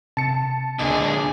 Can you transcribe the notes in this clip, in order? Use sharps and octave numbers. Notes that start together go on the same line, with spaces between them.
C3 A5 C#7
C#2 A#2 D3 G#4 D#5 D#6